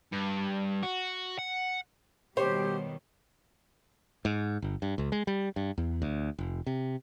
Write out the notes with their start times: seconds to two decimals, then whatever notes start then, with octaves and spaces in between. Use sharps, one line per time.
0.12 G2
0.83 F#4
1.39 F#5
2.37 B2 D#3 G3 G4 C5 C#5
4.25 G#2
4.62 G1
4.82 G2
4.98 C#2
5.12 G#3
5.27 G3
5.56 G2
5.78 E2
6.02 D2
6.38 F1
6.67 C3